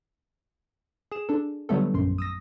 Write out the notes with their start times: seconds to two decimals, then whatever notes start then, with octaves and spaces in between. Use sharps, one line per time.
1.11 G#4 E7
1.29 D4 A4
1.69 D3 F#3 G3 A3 B3 A4
1.94 A#1 F#2 C6
2.18 D#6 E6 A#6